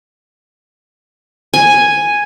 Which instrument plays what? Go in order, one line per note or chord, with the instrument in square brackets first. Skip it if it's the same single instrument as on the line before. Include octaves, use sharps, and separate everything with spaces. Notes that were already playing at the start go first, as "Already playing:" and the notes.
[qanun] G#5